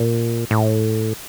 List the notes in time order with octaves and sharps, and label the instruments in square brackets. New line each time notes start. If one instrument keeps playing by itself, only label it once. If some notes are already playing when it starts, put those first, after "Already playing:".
Already playing: [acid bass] A#2
A2